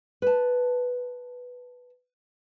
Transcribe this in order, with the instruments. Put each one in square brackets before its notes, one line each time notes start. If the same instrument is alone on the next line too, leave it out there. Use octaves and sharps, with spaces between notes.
[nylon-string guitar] B4 A5